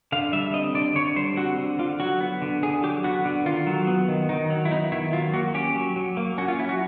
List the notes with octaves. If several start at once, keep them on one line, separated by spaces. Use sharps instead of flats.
D3 F5
G3 E5
C4 D#5
D3 D5
D3 C#5
G3 C5
C4 F#4
D3
D3 F4
F#3 F#4
B3
D3
D3 G#4
F#3 G4
B3 F#4
D3
D#3 F4
F#3
B3
D#3
D#3 D#4
F#3
E4
B3 D#4
D#3 E4
F#3 F4
A#3 F#4
C#4 G4
F#3
F#3
A#3
C#4 F#4
F4
F#3 E4
F#4